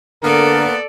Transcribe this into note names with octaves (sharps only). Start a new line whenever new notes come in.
D3 A#3 B3 A4 A#4 D5